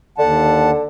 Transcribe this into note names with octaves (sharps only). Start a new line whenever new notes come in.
D#2 D3 F#5 A5